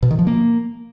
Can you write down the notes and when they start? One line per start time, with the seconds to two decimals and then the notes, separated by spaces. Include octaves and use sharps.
0.03 B2
0.11 D#3
0.19 F3
0.27 A#3